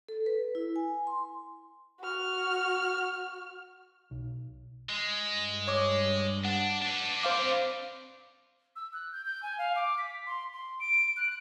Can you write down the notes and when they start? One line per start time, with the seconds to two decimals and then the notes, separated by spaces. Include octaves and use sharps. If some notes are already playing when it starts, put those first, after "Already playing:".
0.09 A4
0.26 B4
0.55 E4
0.76 G#5
1.07 C6
2.00 F#4 F6
4.11 B1
4.89 G#3
5.26 G2
5.68 C#5 D6
6.45 D4 F#5
6.82 D4 B4 D6 C#7
7.23 C4 C5 F5 D6
8.76 E6
8.93 F#6
9.12 G6
9.26 G6
9.43 G#5
9.58 F5
9.76 D6
9.98 B6
10.27 C6
10.53 C6
10.80 D7
11.17 F#6